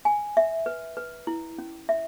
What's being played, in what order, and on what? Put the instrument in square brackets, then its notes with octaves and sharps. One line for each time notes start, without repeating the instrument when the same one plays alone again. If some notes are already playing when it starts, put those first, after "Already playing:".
[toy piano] G#5
E5
B4
B4
E4
C#4
E5